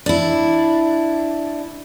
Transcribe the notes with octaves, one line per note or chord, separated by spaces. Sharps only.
D4 E4